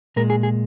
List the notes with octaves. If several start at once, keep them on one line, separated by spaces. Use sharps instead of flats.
A#2 G#3 A#4
G#4
G#4